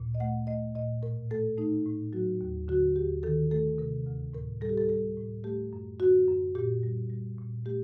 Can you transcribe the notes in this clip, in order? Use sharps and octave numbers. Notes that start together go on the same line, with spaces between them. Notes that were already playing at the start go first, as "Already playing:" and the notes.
Already playing: D2 A#2
D#5
A3 F#5
A3 D#5
A#2 D#5
A2 A#4
A3 A4
A3 D#4
A2
F#3 F#4
D#2
D3 F#4
D#2 G4
D#3 A4
A3 A4
C3 A#4
D2
A2 A#4
G3 A4
G4
A4
G3 A4
A2
A3 G4
F#2
D3 F#4
F#2
A#2 G4
G3
G3
A#2
A3 G4